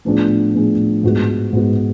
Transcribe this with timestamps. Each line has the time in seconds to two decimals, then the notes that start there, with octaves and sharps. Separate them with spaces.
0.05 A2 F3 B3 D4 G#4
0.55 A2 F3 B3 D4 G#4
1.03 G#2 G#3 B3 F#4
1.53 G#2 G#3 B3 F#4